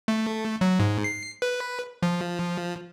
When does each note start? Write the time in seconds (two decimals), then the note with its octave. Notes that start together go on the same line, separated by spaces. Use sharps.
0.08 A3
0.61 F#3
0.80 G#2
1.04 C7
1.42 B4
2.03 F3